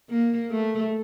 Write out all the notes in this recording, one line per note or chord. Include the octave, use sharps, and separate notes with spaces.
A#3
A3